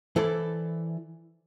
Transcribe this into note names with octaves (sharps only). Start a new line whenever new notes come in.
E3 E4 A4 C5 D5